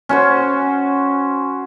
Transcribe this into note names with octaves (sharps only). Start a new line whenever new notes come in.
C#4 F#4 C5